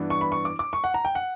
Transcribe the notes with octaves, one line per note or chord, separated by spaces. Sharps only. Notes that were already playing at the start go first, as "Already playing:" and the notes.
Already playing: G2 E3 B3 D4
C#6
B5
C#6
D6
D6
C#6
F#5
A#5
G5
F#5